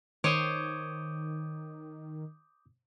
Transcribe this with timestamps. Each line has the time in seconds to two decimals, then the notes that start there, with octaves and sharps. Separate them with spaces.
0.24 D#3 C5 C#5 D6 D#6 G6